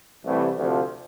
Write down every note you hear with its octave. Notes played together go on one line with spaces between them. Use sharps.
C2 C3 E3 A3
D2 C3 F3